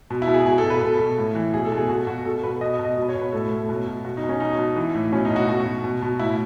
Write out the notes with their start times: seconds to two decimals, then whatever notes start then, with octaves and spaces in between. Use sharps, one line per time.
0.10 B2
0.22 E4
0.27 B2
0.34 G#4
0.45 B2 G#4
0.58 A4
0.64 B2
0.70 B4
0.81 B2 A4
0.99 B2
1.18 A2
1.35 E3
1.53 B2 G#4
1.65 A4
1.72 B2
1.77 G#4
1.89 B2 F#4
2.07 B2 F#4
2.25 B2 A4
2.43 B2 B4
2.61 B2 D#5
2.74 D#5
2.79 B2
2.85 D#5
2.97 B2
3.02 B4
3.09 C#5
3.15 B2
3.21 B4
3.32 A2 A4
3.51 A2
3.69 B2
3.87 B2
4.05 B2 F#4
4.17 D#4
4.23 B2
4.29 C#4
4.40 B2 D#4
4.59 B2
4.76 E3
4.95 A2
5.12 B2 C#4
5.25 D#4
5.31 B2
5.36 F#4
5.48 B2 F#4
5.66 B2
5.84 B2
6.02 B2
6.19 A2 E4